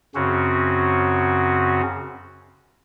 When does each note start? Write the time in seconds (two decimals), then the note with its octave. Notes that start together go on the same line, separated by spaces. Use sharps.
0.15 F#2 C#3 C4 C#4 F#4